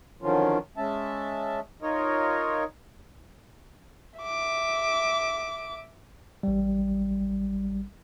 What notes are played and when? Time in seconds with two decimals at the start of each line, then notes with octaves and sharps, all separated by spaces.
0.22 D3 D#3 F3 F#3 C#4 F4
0.77 G#3 C#4 E5 A5
1.82 D#4 F4 A#4 C#5 D#5
4.19 E5 D6
6.43 A1 G3